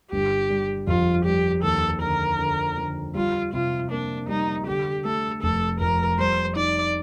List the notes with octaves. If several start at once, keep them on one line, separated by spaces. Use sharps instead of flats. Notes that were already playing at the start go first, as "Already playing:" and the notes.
G1 G4
G3
F2 F4
G3 G4
D#2 A4
D3 A#4
D3
D3
G3 F4
C3 F4
A#3 D4
G3 D#4
D3 G4
A3 A4
F1 A4
F2 A#4
G3 C5
D#4 D5